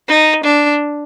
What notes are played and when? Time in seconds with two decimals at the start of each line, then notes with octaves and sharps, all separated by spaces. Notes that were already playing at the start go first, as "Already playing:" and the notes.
0.08 D#4
0.44 D4